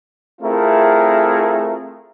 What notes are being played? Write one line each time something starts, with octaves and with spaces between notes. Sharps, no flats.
A3 C4 E4 F4 G#4 A#4